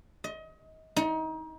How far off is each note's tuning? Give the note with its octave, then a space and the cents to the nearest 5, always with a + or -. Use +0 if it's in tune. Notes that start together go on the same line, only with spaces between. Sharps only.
D#5 +30
D#4 +30